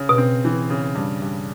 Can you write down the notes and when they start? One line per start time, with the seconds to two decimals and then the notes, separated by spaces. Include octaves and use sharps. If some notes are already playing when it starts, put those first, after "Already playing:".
Already playing: C#3
0.09 B2
0.18 C4
0.45 E3
0.70 C#3
0.95 G2
1.22 G2